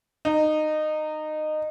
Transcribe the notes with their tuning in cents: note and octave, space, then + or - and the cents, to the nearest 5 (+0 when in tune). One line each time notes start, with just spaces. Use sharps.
D#4 -20